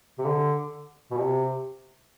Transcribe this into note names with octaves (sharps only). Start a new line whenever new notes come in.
C3
D3
B2
C3